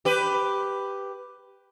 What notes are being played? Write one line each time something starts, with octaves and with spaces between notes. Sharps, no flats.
G4 B4